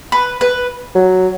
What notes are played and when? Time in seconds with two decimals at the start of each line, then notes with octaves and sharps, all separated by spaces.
0.12 B4
0.41 B4
0.95 F#3